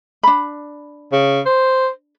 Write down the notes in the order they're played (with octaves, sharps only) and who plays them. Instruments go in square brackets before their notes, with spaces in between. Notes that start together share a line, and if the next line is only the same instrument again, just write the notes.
[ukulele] D4 B5
[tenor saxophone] C#3
C5